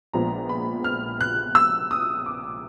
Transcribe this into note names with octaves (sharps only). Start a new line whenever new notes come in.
A#1 A#2 F3 G#3 B3 A#5
B5
F6
F#6
E6
D#6
D6